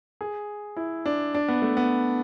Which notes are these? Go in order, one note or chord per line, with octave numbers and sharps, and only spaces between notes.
G#4
E4
D4
D4
B3
A3
B3